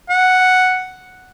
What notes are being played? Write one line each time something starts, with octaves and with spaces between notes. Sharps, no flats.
F#5